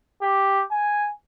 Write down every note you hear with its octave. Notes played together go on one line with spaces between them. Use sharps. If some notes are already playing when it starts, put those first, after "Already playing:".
G4
G#5